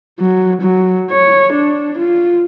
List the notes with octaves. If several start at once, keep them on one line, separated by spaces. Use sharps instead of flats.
F#3
F#3
C#5
D4
F4